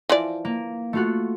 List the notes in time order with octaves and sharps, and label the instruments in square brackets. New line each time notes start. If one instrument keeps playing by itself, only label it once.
[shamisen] E3 F3 D5
[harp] A#3
A3 F4 F#4